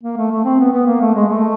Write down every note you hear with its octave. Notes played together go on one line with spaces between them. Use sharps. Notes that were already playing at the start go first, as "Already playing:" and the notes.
A#3
A3
A3
C4
B3
B3
A#3
A3
G#3
A3